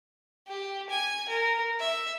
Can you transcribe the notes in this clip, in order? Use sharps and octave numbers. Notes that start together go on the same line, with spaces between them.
G4
G#5
A#4
E5